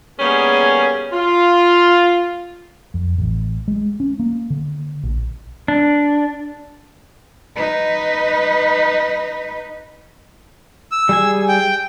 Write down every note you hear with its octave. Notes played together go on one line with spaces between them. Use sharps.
G3 A#3 B3 C#4 G#4
F4
F2
A1
G#3
C#4
A#3
D3
A#1
D4
D#4 B4
E6
G3 G#4 G#5
G5